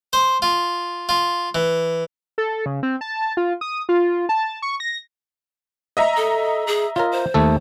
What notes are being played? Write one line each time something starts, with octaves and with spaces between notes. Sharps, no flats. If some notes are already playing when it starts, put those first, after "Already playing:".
C5
F4
F4
E3
A4
C#3
C4
A5
F4
D#6
F4
A5
C#6
A#6
D#5 E5 A#5
A4
G#4
F4 A#4 C#5
C5
D#2 A3 A4